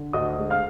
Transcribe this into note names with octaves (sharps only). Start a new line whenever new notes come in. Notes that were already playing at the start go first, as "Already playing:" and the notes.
Already playing: D3
D2 D#5 D#6
G#3
F5 F6